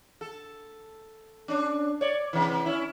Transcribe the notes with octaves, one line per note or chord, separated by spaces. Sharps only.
A4
C#4 D4
C#5 D5
C3 E3
C#4 E4